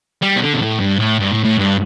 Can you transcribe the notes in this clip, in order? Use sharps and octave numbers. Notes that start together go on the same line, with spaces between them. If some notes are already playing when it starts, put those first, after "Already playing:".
G3
B2
D3
B2
A2
G2
A2
G2
A2
A2
G2